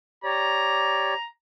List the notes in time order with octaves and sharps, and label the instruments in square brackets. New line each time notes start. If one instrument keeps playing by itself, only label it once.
[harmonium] G4 C#5 D5 [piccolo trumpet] A#5